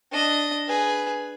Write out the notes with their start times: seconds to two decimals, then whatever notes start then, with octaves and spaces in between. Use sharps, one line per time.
0.12 D4 D#5
0.67 G#4 B4